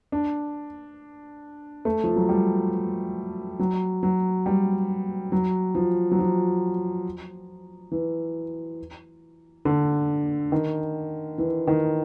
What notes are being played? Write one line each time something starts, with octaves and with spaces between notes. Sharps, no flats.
D4
A3
F3
F#3
G3
F#3
F#3
G3
F#3
F3
F#3
F3
E3
D3
D#3
E3
D#3